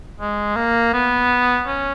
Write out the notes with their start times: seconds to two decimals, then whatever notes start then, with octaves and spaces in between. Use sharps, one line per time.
0.20 G#3
0.56 A#3
0.93 B3
1.67 C#4